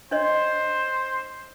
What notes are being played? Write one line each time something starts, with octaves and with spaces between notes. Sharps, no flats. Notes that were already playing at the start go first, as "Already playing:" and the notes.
D4 C5 C#5 D#5